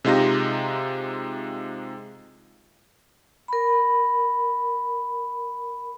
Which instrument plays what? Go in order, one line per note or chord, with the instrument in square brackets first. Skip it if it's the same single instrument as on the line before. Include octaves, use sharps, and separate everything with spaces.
[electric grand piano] C3 G#3 D#4 F4 G4 A#6
[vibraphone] A#4 B5